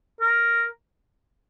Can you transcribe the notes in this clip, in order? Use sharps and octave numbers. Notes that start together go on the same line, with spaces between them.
A#4